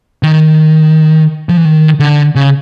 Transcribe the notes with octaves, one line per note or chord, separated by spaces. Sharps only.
D#3
F3
E3
D#3
D3
C#3